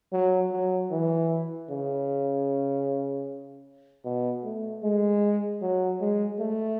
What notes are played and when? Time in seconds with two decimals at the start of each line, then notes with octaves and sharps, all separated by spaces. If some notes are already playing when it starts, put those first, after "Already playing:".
0.12 F#3
0.52 F#3
0.91 E3
1.70 C#3
4.05 B2
4.44 A3
4.83 G#3
5.61 F#3
6.00 G#3
6.39 A3